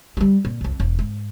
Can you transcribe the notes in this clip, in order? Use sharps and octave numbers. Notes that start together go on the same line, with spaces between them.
F#3 G3
A#2
C2 F2
E1
G#2